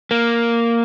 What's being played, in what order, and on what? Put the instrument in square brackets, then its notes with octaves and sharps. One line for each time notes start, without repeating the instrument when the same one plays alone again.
[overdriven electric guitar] A#3